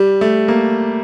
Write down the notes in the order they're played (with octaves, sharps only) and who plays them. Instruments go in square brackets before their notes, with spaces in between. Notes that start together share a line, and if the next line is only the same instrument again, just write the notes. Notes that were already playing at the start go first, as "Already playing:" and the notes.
Already playing: [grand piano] G3
A3
A#3